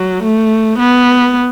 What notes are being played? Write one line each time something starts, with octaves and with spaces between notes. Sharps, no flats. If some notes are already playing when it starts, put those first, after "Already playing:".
Already playing: F#3
A3
B3